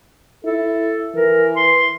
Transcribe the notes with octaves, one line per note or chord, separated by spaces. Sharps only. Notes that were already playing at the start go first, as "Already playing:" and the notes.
E4 A4
E3 A#4
C6